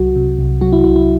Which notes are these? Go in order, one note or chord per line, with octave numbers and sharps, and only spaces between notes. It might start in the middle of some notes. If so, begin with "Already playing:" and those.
Already playing: C2 F#3 F#4
C3
C2
F#3 F#4
E4
C2 E4
E4